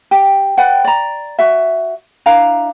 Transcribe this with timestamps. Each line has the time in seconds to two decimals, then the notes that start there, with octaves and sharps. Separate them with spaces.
0.11 G4
0.57 B4 D5 F#5 G5
0.84 D5 A#5
1.39 F#4 E5
2.26 D4 E4 F5 A#5